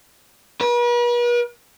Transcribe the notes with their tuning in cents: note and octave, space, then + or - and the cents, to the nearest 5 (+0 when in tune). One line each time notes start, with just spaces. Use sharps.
B4 -45